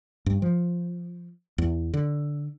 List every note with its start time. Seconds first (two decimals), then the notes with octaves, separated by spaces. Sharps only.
0.26 G2
0.42 F3
1.58 E2
1.94 D3